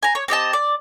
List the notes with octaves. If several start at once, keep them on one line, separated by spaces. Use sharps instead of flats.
G#5 A#5
C#5
C4 G4 D#5 A5
D5